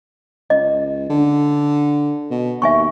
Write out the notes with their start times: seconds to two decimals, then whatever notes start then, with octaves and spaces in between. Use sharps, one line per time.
0.50 C#2 D#5
1.10 D3
2.31 B2
2.62 D#2 E5 G#5 C#6